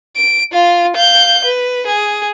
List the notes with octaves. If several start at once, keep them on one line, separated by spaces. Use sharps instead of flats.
D7
F4 F5
F5 G6
B4
G#4